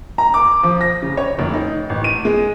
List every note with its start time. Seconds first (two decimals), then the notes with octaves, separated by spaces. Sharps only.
0.18 A#5
0.34 D6
0.63 F3
0.81 A#6
1.02 C#3
1.17 C#5
1.39 F1
1.54 D#4
1.90 A1
2.04 D#7
2.25 G#3